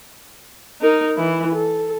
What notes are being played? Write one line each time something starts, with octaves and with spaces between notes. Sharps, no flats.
D#4 A#4
E3 E4
A4